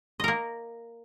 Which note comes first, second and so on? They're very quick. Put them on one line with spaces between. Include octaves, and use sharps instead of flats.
D#5 A#4 A#3